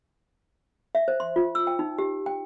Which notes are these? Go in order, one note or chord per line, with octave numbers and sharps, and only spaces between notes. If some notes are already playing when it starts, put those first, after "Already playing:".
E5
C5
C6
F4
E6
G5
D#4
G4
G5